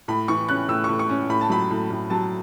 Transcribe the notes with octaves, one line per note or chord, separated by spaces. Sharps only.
A2 B5
E3 C#6
C#4 F#6
A2 E6
A2 C#6
C#6
C#4
A2 B5
A5
F#3 B5
A2
A2
F#3 A5